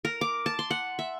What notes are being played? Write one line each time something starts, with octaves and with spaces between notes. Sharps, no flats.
A#4
D6
A5
C6
F#5
E5